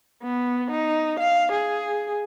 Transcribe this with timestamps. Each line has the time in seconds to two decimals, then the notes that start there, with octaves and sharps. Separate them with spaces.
0.23 B3
0.71 D#4
1.20 F5
1.52 G#4